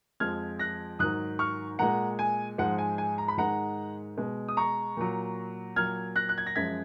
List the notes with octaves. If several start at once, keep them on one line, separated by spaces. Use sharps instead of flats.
F2 F3 G#3 F6 G#6
F#6 A#6
G#2 D#3 F#3 D#6 F#6
C#6 F6
A#2 G#3 F#5 A#5
G#5
G#2 F3 G#3 F#5
G#5
G#5
A#5
B5
G#2 D#3 G#3 F#5 A#5
B2 G#3
D#6
A#5 C#6
A#2 F#3
A#2 F#3 F6 G#6
F#6 A#6
F#6
G#6
A#6
F#2 F3 G#3 G#6 B6